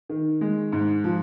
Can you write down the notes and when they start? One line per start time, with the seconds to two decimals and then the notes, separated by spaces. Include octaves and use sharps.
0.09 D#3
0.41 G#3
0.72 G#2
1.04 F3